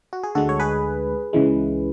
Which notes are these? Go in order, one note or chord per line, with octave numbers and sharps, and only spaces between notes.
F#4
G#4
D2 D3 G#3 F#4 A4
C#5
G#4 B4
C#2 C#3 E3 G#3